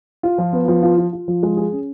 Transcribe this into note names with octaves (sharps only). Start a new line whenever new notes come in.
F4
F3
B3
F3
F4
F4
F4
F3
G#3
G#4
C#4